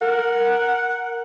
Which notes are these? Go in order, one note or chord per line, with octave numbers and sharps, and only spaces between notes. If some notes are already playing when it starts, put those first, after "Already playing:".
A#4 F#5